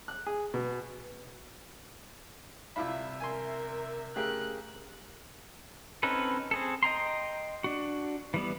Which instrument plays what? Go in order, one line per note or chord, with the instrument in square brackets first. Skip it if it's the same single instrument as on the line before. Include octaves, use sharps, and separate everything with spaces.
[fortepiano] F#6
G#4
B2
[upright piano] C2 C3 [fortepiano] E4 F4 B5 [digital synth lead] E5
[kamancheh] A#4 [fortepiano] G#5 C6
[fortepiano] C#3 [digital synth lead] A3 [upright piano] G4 G#4 A#4 [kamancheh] F#6
[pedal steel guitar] C4 C#4 D#4 A4 B4
C4 G#4 A4
D#5 G5 A#5 C6
D4 F#4
E3 G3 B3